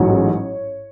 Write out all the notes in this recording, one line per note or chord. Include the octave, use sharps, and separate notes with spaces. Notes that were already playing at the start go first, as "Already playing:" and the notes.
Already playing: A1 G#2 F#3 C#5